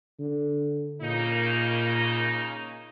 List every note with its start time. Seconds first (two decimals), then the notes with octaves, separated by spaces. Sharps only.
0.19 D3
1.01 A#2 C#3 A#3 D#4